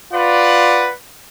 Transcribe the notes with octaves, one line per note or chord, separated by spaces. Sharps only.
F4 B4 D5 F#5